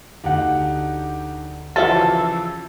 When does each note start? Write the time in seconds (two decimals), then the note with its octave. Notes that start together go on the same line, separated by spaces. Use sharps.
0.24 D2 D4 D#4 G4 F#5
1.76 C#3 E3 F3 F4 F#4 A4 E5